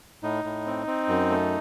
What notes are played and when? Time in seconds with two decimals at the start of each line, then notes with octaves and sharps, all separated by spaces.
0.23 A2 D#4
0.44 A2
0.66 C4
0.87 C4
1.08 F#2
1.30 A3